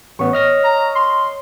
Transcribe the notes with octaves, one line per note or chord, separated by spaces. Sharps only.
A1 B3 C#5
D#5 F6 A#6
A#5
C6